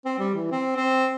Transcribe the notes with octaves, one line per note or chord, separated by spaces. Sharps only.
C4
G3
E3
C4
C4